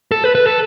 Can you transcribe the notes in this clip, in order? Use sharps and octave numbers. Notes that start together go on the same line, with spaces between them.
A4
B4
B4
A4